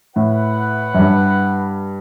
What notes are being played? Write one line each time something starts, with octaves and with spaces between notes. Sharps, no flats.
A2 E4 B4 F#5
F#2
G2